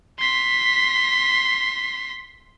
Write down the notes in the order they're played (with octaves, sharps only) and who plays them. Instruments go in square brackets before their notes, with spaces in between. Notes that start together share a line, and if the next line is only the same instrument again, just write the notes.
[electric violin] C6 B6